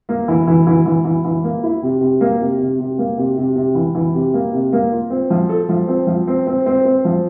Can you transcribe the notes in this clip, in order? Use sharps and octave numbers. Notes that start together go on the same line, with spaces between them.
A#3
E3
E3
E3
E3
E3
E3
A#3
E4
C3
C3
A#3
C3
C3
C3
A#3
C3
C3
C3
E3
E3
C3
A#3
C3
A#3
F4
C4
F3
A4
F3
C4
F3
C4
C4
C4
C4
F3